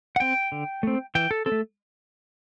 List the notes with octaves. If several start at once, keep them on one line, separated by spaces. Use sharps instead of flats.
F#5
C4 G5
D3
A3 C4
E3 G5
A4
C4 A4
A3